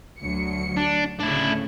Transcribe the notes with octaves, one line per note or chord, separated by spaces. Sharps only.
D2 F#3 C#7
D4
D2 A2 C#3 D4 E4